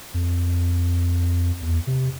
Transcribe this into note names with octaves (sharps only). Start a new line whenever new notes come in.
F2
E2
C3